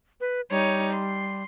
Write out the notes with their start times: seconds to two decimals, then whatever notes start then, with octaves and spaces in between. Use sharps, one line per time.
0.21 B4
0.50 G3 D#4 C#5
0.92 C6